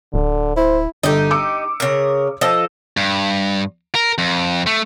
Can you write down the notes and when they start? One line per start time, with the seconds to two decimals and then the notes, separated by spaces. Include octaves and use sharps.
0.14 D1 D3
0.56 E4 C5
1.03 G1 D#4 G4 A4
1.31 D6 E6 C#7
1.80 C#3 A#4
2.41 F3 A4 D#5
2.97 G2
3.95 A#4
4.18 F2
4.67 A3